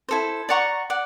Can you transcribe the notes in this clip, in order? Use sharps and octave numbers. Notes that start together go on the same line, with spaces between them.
E4 A4 C5
D5 F#5 A#5 C#6
D5 F#5